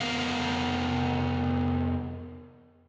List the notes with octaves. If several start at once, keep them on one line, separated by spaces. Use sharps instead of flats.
F2 B3 A#4 F5